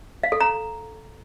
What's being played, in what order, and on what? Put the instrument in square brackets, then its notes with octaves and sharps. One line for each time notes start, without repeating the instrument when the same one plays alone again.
[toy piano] F5
A4
A#5